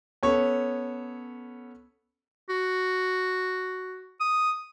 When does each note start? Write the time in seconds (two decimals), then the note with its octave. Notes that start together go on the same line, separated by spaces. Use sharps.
0.23 B3 C#4 A4 C#5
2.49 F#4
4.21 D#6